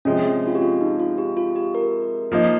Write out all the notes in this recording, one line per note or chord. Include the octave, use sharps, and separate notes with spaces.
C3 F3 G#3 C#4
C#4
C#4
F4
G4
F4
D#4
F4
G4
F4
G4
A#4
F3 A#3 D#4